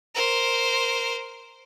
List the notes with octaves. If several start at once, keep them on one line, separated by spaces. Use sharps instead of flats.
A#4 C5